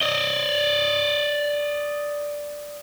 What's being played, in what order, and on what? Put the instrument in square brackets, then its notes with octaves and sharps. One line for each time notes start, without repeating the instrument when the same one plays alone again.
[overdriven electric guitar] D5 D#5